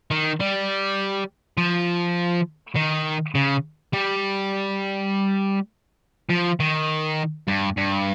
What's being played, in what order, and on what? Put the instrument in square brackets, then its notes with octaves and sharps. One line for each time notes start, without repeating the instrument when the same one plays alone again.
[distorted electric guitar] D#3
G3
F3
D#3
C#3
G3
F3
D#3
G2
G2